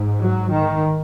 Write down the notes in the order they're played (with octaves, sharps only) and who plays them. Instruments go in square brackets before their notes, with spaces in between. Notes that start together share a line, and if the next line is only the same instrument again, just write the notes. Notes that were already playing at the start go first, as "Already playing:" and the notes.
Already playing: [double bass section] G#2
F#3
D#3